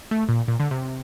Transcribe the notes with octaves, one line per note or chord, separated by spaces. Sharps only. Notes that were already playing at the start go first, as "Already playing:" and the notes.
A3
A#2
A#2
D3
C3